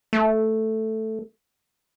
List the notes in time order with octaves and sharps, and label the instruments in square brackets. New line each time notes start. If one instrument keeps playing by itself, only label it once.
[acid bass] A3